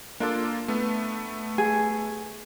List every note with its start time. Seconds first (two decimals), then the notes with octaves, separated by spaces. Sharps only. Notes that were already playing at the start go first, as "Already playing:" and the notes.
0.20 A#3 D4 F4 A4
0.68 A3 B3
1.58 G#4